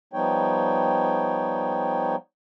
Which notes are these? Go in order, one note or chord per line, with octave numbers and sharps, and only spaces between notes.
F3 G3 B3 D#4 C#5 G5